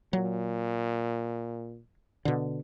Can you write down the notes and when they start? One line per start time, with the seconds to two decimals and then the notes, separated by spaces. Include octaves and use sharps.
0.13 A#2 F#3
2.25 B2 D3